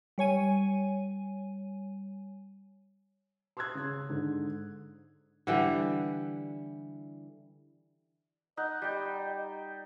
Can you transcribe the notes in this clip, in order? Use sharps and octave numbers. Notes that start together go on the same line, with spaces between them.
G3 C#5 G#5 D#7
C6 D#6 E6 F#6 G#6
C#3
G#2 D3
D3 E3 G3
D#4 D#5 F#5
G3 G5